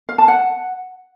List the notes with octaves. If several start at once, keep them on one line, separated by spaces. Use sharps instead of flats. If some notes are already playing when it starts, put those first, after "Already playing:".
F5
A5
F#5